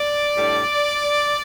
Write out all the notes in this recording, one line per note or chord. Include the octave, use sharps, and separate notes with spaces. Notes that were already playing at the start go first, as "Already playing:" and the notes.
Already playing: D5
A2 G3 D4